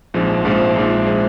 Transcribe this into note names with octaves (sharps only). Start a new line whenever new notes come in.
A#1 G#2 F3 G#3 C4
A#1 G#2 F3 G#3 C4
A#1 G#2 F3 G#3 C4
F3 G#3 C4